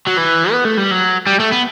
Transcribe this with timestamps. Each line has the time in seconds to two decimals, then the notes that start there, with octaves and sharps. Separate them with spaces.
0.07 F#3
0.18 E3
0.52 B3
0.65 A3
0.77 G3
0.91 F#3
1.27 G3
1.40 A3
1.52 B3